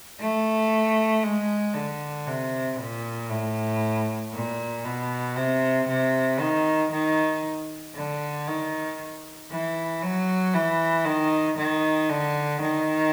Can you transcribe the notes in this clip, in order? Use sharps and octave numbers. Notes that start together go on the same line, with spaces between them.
A3
G#3
D3
C3
A#2
A2
A#2
B2
C3
C3
D#3
D#3
D3
D#3
E3
F#3
E3
D#3
D#3
D3
D#3